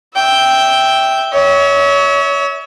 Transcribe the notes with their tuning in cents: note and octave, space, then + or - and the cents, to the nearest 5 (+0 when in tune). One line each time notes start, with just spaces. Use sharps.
E5 -5 G5 +0
C#5 +25 E5 -35